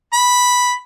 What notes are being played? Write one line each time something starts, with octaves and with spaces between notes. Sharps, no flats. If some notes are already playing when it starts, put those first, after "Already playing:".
B5